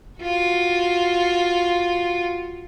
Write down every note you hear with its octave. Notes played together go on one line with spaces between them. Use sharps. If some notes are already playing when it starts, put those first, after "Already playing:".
F4 F#4